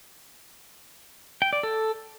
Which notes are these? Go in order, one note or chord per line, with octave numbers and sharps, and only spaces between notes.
G5
D5
A4